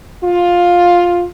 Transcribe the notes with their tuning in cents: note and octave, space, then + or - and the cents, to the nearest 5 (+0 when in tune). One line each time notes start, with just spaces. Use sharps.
F4 +10